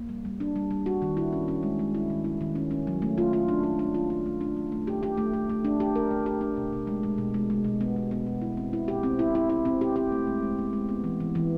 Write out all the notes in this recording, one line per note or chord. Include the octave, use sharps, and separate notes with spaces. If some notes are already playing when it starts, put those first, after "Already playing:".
Already playing: A#3
G3
G3
D4
G3
G3
F#4
D#3
E4
C#4
C#4
G#3
G#3
E4
D#3
E4
D#3
C#4
C#4
F#3
A3
F4
F4
D4
F4
D4
F4
D4
A3
D4
A3
A3
G4
G4
A3
A3
A3
D4
G4
A#4
A3
G4
D4
B2
B2
G#3
G#3
B2
G#3
G#3
B2
B3
B3
B3
B2
E4
C4
E4
G4
C4
E4
E4
E4
C4
G4
G4
A3
G#3
G#3
B3
G#3
B3
E3
E3
E3